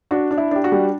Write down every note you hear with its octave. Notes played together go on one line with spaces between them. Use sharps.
D4 F#4
D4
E4
D4 G4
F#4
G3